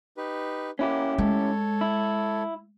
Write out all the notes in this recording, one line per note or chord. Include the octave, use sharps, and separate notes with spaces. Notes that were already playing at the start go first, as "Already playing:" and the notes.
D#4 G4 B4
A#3 C#4 E4 G4 F#5
G#3 A4 C#5
E4